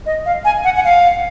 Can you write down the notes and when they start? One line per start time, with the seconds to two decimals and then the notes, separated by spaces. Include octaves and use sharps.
0.06 D#5
0.26 F5
0.45 G#5
0.64 F#5
0.76 F#5
0.84 F5